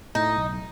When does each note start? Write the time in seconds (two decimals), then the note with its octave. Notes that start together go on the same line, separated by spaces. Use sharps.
0.15 A2 D#4
0.37 B1